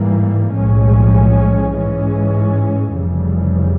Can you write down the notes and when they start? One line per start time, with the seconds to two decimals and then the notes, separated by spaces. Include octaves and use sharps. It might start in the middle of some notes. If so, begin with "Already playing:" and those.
Already playing: G#2 E3 G3 A#3
0.54 B1 A2 F3 G#3 C#4
1.73 G#2 E3 G#3 C#4
2.93 F1 F2 C#3 E3 G3